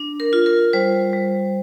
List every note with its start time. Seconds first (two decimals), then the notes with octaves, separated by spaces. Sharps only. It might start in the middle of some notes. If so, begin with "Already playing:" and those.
Already playing: D4
0.20 A#4
0.33 F4
0.46 A#4
0.73 G3 C5
1.13 G3